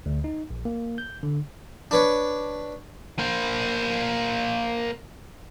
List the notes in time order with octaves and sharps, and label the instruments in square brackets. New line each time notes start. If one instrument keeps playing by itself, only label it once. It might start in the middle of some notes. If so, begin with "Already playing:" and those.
[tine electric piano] D2
D#4
A#1
A#3
G6
D3
[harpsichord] D4 B4 C#5
[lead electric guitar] A#3 C5